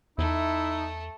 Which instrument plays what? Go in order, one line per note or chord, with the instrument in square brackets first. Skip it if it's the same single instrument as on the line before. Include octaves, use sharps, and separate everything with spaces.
[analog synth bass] E2 [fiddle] A3 [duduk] D#4 [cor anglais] E4